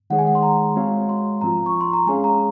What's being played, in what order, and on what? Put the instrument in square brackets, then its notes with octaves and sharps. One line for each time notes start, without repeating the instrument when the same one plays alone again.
[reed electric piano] D#3 G#3 D#4 G#4 C#5 [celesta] F#5
[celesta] G#5
F#5
C6
A#5
[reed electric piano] G#3 C4 F#4 C#5 F5
[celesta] C6
[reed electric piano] G#2 F3 C4 F4 [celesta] A#5
[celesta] C#6
C6
A#5
[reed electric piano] G#3 C#4 G#4 C#5 F5 [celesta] G#5
[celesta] A#5